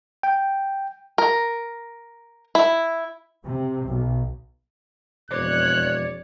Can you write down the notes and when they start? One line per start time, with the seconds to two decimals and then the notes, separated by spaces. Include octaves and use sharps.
0.23 G5
1.18 A#4
2.55 E4
3.45 C3
3.88 B1
5.31 E1 F2 C#5 D5 F#6